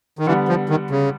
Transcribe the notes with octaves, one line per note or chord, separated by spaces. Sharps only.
D#3
D3 E3 G3 B3
F3
D#3
C#3